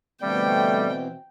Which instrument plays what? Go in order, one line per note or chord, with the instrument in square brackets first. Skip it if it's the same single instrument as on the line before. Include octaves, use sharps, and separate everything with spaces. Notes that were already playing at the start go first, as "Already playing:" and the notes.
[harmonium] B2 E3 C4 [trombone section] D3 A3 [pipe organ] G3 [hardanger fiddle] G5